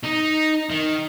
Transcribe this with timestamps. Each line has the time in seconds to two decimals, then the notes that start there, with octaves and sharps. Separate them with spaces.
0.03 D#4
0.70 D#3